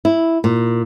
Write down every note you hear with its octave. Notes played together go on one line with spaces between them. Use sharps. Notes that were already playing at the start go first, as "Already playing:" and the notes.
E4
A#2